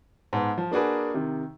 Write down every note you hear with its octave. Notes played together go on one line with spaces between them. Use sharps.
G#2 B3 A5
F3
A#3 D4 F#4 G#4 B4
C3 D#3